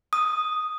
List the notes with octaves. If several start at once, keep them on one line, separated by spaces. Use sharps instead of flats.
D#6